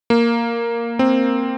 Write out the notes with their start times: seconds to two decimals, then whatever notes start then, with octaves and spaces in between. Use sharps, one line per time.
0.10 A#3
0.99 C4